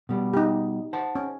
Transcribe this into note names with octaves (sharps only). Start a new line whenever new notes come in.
B2 G3
D#4 G4
C5 F#5 A5
C#4